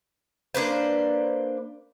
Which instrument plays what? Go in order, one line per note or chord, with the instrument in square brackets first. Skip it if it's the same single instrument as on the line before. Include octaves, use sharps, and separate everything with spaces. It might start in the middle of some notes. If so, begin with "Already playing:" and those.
[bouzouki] A#3 D4 B4 C5